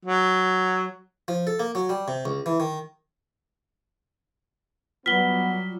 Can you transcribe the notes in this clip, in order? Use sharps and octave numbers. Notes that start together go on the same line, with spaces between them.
F#3
F3
A4
A#3
F#3
G3
C3
C#2
E3
D#3
F#3 G3 B3 F4 B6 G7